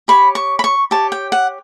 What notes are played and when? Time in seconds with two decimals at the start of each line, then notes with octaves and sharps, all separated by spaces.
0.08 G4 C#5 B5
0.35 C#6
0.59 B5
0.64 C#6
0.91 G4 C#5 A5
1.12 G5
1.32 F#5